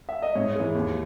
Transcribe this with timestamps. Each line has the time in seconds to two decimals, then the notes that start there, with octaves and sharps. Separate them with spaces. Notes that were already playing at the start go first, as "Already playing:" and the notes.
0.09 E5
0.22 D#5
0.35 G#2 C#5
0.55 E3 G#3
0.75 D#2